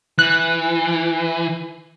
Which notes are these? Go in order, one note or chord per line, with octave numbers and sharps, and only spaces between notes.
E3 F#6